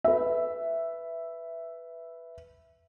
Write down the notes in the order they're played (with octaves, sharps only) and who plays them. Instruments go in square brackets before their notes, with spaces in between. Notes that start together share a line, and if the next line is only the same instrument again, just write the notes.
[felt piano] B4 E5